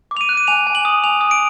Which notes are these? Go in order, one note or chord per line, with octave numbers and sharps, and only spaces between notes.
D6
F7
D#7
F#6
D#7
G#5 F7
G#5
F#7
D#6
G#5 F7
D#6
D7